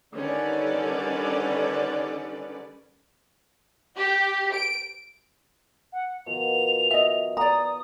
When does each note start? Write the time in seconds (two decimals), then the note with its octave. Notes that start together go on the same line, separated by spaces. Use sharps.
0.14 D3 D#3 G3 C#4 B4 D5
3.96 G4
4.54 D7
5.93 F#5
6.26 B2 D#3 F3 F7
6.91 D#5 E5
7.37 D5 A#5 D#6